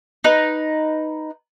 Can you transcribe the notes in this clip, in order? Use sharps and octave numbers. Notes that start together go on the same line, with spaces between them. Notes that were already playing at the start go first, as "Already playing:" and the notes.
D#4 B4